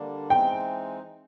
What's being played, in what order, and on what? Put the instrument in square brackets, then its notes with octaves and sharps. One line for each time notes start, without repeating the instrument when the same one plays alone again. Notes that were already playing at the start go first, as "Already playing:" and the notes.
Already playing: [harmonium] D3 G3 A#3 D4
[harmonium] E3 G#3 C4 D#4 [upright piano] G5